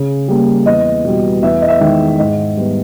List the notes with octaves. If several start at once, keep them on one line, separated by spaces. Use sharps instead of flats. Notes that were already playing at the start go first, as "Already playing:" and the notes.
Already playing: C#3
G3 A#3
E2 D#5
B2 G3
E2 E5
D#5
E5
D#3 G#3
G#2 D#5
G3 B3